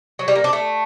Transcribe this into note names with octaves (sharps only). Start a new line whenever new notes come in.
F#3
G3
A#3
D4
A3